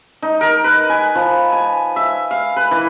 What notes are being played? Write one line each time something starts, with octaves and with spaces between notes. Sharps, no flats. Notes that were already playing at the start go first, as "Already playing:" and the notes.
D#4
A#4
B4
G#5
F3
G#5
E5
F5
B4
E3